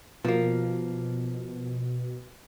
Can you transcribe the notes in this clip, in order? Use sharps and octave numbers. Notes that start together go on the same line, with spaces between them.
B2 F3 A#3